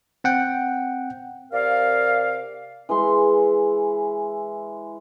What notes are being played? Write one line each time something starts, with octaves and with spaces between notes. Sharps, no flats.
C4 F#5 G5
C3 A#4 D5 F5
E3 G#3 C6